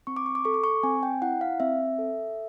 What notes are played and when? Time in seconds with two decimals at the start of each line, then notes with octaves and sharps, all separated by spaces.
0.07 C4 C#6
0.17 D6
0.26 C#6
0.35 D6
0.45 A4 C#6
0.54 D6
0.64 C#6
0.83 C4 G#5
1.03 G5
1.22 E4 F#5
1.41 F5
1.60 C4 E5
1.98 A4